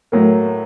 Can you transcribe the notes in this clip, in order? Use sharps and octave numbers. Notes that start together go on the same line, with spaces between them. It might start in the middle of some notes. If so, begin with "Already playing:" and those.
A2 F#3 A#3